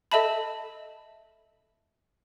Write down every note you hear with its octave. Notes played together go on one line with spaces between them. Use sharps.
A4 D#5 E5 A5 B5